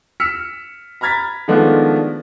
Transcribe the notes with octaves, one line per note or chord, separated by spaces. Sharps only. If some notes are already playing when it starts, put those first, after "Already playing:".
E6 F6 B6 C#7
A#5 B5 F6 G#6 A6 B6
D#3 F3 G#3 A3 B3 D4